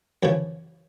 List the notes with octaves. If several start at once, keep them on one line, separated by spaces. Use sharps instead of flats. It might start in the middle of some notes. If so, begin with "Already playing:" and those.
F#2 C#3 E3 F3